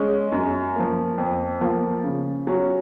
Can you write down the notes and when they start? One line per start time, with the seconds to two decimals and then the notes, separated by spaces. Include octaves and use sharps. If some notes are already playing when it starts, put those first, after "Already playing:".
Already playing: G#3 C#4
0.32 F#2
0.76 F3 A#3
1.18 F2
1.61 F3 A#3 F4
2.04 C#3
2.47 F#3 C#4